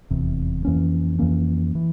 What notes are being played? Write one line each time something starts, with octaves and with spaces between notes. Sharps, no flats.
F1 E2 C3
F2 E3 A#3 C#4
F2 E3 A#3 C#4
E3